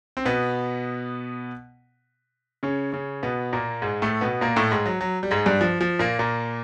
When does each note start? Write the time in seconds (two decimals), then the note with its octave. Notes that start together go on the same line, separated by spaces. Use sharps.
0.17 C4
0.25 B2 B3
2.63 C#3 C#4
2.92 C#3 C#4
3.23 B2 B3
3.53 A#2 A#3
3.82 G#2 G#3
4.02 A2 A3
4.21 B2 B3
4.41 A#2 A#3
4.56 A2 A3
4.71 G#2 G#3
4.86 F#3
5.01 F#3
5.23 G3
5.31 G#2 G#3
5.46 G2 G3
5.61 F3
5.81 F3
5.99 A#2 A#3
6.19 A#2 A#3